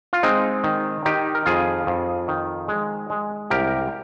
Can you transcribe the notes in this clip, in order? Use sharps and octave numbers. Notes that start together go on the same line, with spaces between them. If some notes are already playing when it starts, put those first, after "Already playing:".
F4
G#3 C4 D#4
D#3
D#3 D#4 G4
A#4
F2 F4 G#4
F2
D#3
G#3
G#3
C2 G4 A#4